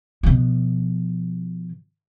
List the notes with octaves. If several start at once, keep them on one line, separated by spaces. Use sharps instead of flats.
B2 F3